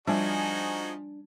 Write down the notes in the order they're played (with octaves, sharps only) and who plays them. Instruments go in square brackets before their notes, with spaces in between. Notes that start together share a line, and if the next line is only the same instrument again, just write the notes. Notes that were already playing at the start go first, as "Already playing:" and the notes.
[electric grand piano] F3 G#5 [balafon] G3 [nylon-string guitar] D4 [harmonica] D#4 F#4 G#4